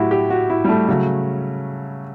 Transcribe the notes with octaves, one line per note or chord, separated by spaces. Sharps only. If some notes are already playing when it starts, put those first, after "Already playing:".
Already playing: A2 F#3 E4 F#4 G4
G4
F#4
E4
G3
A3
C#3 F#3 A3